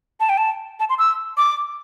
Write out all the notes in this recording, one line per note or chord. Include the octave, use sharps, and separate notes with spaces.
A5
G5
A5
A5
C6
E6
D6